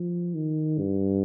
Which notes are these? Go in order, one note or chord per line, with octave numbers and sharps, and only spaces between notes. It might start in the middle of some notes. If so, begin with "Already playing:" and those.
Already playing: F3
D#3
G2